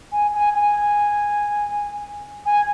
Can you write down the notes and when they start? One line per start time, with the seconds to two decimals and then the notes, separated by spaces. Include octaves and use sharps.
0.12 G#5
0.34 G#5
0.54 G#5
2.46 G#5